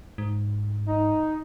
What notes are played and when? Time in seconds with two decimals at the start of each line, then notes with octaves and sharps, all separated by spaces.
0.18 G#2
0.88 D#4